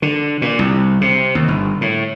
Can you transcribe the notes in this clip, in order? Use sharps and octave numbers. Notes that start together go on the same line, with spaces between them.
D3
A#2
C2
C3
D#2
G1
A2